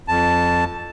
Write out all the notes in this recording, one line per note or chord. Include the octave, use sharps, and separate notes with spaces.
F2 A5